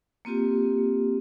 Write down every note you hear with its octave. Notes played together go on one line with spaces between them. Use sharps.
A#3 C4 F4 G4